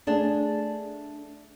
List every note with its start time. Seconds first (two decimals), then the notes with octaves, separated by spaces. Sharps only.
0.07 A3 D4 G#4